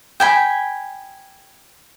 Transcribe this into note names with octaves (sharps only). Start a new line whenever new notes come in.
G5 G#5 B5